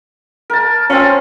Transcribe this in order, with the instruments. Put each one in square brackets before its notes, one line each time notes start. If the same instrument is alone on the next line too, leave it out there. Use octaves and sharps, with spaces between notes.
[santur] A#4 A5
[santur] C4 F4 [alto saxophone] C#4